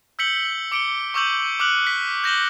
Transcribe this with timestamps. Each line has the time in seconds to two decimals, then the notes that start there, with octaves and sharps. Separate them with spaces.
0.19 E6 G6 B6 C#7 F#7 G7
0.72 D6 C#7 D7 F#7 G7
1.14 C#6 D6 E6 G6 F#7
1.60 D6 F6 F#6 C#7 F#7
1.87 B6
2.24 G6 A#6 E7 F#7 G7